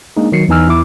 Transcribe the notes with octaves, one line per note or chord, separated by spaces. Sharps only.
G#3 A#3 D4 D#4
D#3 F#3 F#4 C7 C#7
E2 E3 D#4 G#5 E6 F6
E2 E4 D6